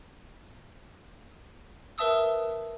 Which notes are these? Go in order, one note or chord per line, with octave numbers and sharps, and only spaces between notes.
A#4 B4 E5 A5 D#6 E6